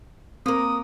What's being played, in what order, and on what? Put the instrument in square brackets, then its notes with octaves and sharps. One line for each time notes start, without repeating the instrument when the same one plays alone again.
[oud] A#3 A#4 [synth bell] C4 [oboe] D#6